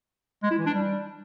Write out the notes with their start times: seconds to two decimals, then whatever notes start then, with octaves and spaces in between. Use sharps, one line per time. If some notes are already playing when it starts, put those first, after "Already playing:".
0.43 G#3
0.51 E4
0.59 E3
0.66 D4
0.74 G3